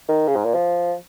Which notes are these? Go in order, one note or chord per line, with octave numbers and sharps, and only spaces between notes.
D#3
C#3
G#2
A#2
F3